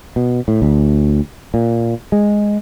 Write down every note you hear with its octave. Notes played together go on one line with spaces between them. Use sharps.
B2
A2
D2
A#2
G#3